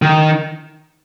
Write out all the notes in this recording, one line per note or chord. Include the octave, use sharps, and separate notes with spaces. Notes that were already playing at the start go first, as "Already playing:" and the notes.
D#3